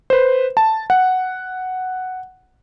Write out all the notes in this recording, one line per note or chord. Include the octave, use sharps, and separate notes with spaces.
B4 C5
A5
F#5